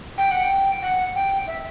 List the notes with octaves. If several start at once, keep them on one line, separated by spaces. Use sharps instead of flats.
G5
F#5
G5
F#5
G5
E5